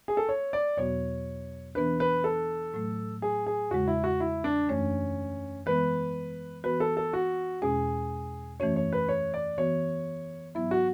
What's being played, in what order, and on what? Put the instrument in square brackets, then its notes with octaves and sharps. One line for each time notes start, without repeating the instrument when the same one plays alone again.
[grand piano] G#4
A4
C#5
D5
[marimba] E2 B2 F#3 B3 F#4 [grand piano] C#5
[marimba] E3 B3 D4 [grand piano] B4
[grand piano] B4
A4
[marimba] A2 F#3 A3
[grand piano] G#4
G#4
[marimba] E2 C#3 G#3 [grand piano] F#4
[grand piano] E4
F#4
E4
D4
[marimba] F#2 E3 A3 D4 [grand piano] C#4
[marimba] E3 G#3 B3 [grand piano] B4
[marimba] E3 B3 F#4 [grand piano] B4
[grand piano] A4
A4
F#4
[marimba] E2 B2 G#3 C#4 [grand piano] G#4
[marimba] F#2 E3 A3 C#4 F#4 [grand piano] C#5
[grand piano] C#5
B4
C#5
D5
[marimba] E3 B3 F#4 [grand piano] C#5
[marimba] G#2 F#3 B3 [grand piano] E4
[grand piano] F#4